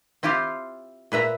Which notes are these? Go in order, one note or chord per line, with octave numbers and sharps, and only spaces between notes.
C4 E4 F4 G4 F5
A#2 B4 E5 A#5